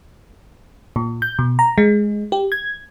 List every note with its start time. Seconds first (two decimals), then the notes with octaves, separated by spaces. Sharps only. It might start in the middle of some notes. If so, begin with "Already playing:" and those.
0.96 A#2
1.22 G6
1.39 B2
1.59 A#5
1.78 G#3
2.32 G4
2.52 G#6